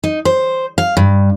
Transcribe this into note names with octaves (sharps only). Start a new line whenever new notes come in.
D#4
C5
F5
G2